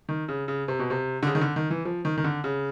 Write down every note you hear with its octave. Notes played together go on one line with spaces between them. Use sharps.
D#3
C#3
C#3
C3
B2
C3
D3
C#3
D#3
D3
D#3
E3
F3
D#3
D#3
D3
C#3